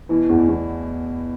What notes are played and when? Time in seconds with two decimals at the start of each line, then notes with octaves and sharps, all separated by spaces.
0.09 B2 E3
0.29 E2
0.39 B2
0.48 E2